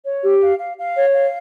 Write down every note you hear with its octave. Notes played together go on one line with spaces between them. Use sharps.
C#5
G4
F5
F5
F5
C#5
F5